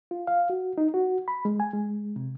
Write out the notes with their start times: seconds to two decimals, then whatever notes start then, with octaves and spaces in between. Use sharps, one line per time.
0.11 F4
0.27 F5
0.50 F#4
0.78 D#4
0.94 F#4
1.28 B5
1.45 G#3
1.60 G#5
1.74 G#3
2.16 C3